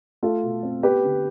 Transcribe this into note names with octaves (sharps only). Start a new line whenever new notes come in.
A3 F4 A4
B2
C4
B3 G4 B4
D3